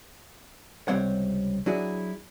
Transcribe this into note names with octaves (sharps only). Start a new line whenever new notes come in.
C#2 C3 G3 C4 C#5 F#5
F#3 D4 E4 F#4 G#4